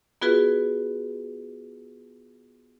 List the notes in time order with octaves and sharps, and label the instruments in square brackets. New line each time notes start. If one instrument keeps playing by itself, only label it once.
[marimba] B3 F4 F#4 G#4 B4